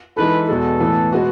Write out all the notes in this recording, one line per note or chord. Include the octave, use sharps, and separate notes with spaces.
E3 G#3 D#4 A4 B4
E2 B2 G#3 A4
A2 E3 B3
B2 G#3 B3 F#4